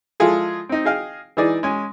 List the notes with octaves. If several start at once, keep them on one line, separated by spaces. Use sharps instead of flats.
F3 G#3 E4 F4 G#4 A4
C4 D#4
G#4 D#5 F5 G5
E3 D#4 G#4 D5
G#3 C#4 G#5